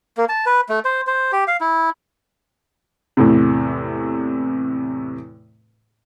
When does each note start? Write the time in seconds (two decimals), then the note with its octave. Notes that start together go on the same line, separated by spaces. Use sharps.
0.17 A#3
0.29 A5
0.46 B4
0.69 A3
0.85 C5
1.07 C5
1.32 G4
1.47 F5
1.61 E4
3.17 E2 A2 C3